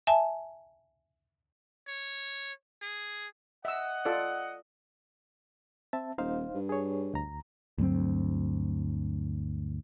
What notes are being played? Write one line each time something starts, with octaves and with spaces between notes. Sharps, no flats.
E5 G#5 A5
C#5
G#4
D#5 E5 F#5 E6
F4 A4 D5
C4 E5 A5
D#1 D#4 C5 F5
G2
G#4 C#5
D2 A#5
D2 G2 F#3 C4